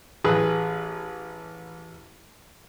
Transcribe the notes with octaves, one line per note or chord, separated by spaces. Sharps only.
A1 G#4 B4